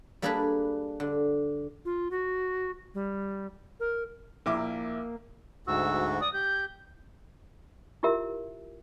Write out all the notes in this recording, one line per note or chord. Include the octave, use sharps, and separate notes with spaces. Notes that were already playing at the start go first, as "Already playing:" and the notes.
G3 A#3 D4 G#4 A4 B4
D3
F4
F#4
G3
A#4
A#1 A#3 E4 D6
D2 G#2 F#4 E6
D5 D#6
G4 G6
E4 F4 G4 A#4 E5